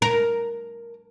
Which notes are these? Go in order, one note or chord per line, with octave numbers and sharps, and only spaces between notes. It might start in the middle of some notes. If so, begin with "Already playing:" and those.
A#4